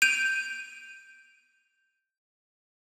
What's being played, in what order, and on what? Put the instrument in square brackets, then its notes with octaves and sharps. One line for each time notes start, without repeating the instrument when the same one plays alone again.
[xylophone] G6 D7 D#7 F7